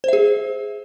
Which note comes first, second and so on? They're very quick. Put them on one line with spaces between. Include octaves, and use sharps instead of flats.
C5 E5 G#4